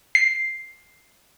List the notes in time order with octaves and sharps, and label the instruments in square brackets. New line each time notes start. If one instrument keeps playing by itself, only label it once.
[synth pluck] C7